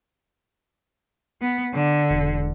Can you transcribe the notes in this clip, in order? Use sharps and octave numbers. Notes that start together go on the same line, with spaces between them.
B3
D3
E1